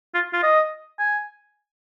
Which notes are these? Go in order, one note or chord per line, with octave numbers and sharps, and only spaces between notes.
F4
F4
D#5
G#5